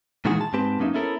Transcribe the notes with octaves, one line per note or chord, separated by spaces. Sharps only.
A#2 D#3 E3 G#3 F#4 G#4
A5
G#2 G#3 C4 G4 B4 A5
F#2 A#3 C#4 D#4 E5
B3 C#4 E4 A4 A#4